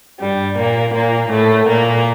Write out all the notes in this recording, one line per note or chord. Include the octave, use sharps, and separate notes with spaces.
G2 G3
A#2 A#3
A#2 A#3
A2 A3
A#2 A#3